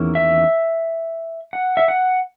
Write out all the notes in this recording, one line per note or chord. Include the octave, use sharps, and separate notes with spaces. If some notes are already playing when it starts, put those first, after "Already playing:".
Already playing: E2 D#3 A#3 C#4 E4
E5
F#5
E5
F#5